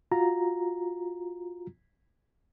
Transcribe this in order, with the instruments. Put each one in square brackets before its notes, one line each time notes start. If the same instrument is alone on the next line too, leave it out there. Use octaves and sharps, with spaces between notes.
[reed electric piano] F4 F#4 A#5